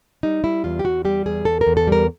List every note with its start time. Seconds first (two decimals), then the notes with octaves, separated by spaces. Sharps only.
0.23 G3 D#4
0.44 G3 E4
0.64 E2 F4
0.79 G4
0.84 E2 F#4
1.05 G3 G4
1.26 E2 G#4
1.45 E2 A4
1.61 A#4
1.67 E2
1.77 A4
1.87 G3 A#4